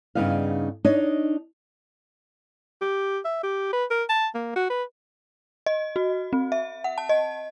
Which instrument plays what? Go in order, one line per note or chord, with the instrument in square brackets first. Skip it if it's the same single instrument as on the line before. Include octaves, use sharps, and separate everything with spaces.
[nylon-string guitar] G2 C#3 B3 D#4 G#4 F5
D4 D#4 C#5 D#5
[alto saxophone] G4
E5
G4
B4
A#4
A5
A#3
F#4
B4
[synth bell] D#5
F#4
C4
E5
F#5
A5
D#5